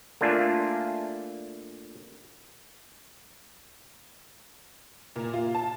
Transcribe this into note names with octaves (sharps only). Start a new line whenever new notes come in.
A3 A#3 D4 F4 G#5
A#2
F4
A5